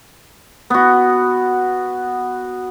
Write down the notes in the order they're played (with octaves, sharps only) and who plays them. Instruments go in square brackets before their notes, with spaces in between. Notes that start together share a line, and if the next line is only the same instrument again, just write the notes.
[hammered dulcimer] B3 F#4